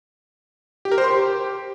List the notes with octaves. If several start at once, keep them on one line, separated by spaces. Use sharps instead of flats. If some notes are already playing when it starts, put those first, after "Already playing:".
G4
A#4
C5
C6
G4